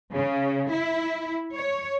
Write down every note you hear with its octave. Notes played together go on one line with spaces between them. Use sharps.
C#3
E4
C#5